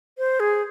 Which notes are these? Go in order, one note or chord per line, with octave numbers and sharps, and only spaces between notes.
C5
G#4